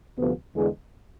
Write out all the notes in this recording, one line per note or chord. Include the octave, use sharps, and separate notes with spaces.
D2 C3 F3 B3
E2 D3 G#3